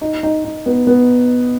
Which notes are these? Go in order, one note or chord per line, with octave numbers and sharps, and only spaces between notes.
D#4
D#4
D#4
B3
B3